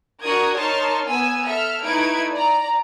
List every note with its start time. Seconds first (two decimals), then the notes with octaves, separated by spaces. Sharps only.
0.22 D4 F#4 A#4 D#6 G#6
0.55 D#4 A#4 C#5 A5 C6 F6
1.07 B3 G#5 E6
1.44 A4 E5 F6
1.83 A3 D#4 E4 B4 G#6 D7
2.32 D5 A#5